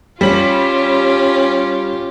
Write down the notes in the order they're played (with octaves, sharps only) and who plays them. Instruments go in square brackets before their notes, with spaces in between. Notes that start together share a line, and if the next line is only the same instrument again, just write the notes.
[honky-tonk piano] G3 F#7 [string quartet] C#4 [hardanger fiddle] F4 G4